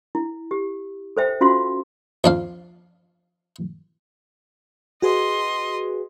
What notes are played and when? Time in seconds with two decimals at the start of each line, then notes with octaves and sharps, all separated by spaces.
0.15 E4
0.51 G4
1.17 A4 C5 E5 G5
1.41 C#4 F4 F#4 F5 C6
2.24 F2 D4 F5
5.02 F#4 G#4 B4 D#5 C6